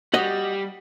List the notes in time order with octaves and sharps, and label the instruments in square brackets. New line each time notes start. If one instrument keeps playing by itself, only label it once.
[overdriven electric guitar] G3 [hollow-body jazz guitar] F#4 D#5